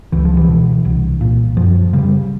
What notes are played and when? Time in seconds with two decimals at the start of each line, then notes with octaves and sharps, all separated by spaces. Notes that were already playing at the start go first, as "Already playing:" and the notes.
0.12 C#2 E3
0.25 F3
0.37 E3
0.48 B2
0.85 C2
1.21 A#2
1.57 F#2 F3
1.93 C#3 G3